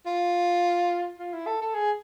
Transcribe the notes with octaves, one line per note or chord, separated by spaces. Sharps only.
F4
F4
E4
A4
A4
G#4